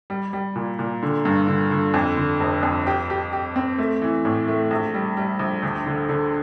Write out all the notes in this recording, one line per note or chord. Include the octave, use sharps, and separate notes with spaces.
G3
G3
A#2
A#2
D3
G2
D3
D3
F2
D3
F1
F2
G4
G4
G4
C4
A3
E3
A2
A3
A#1
G3
G3
A#1
D2
D3
D3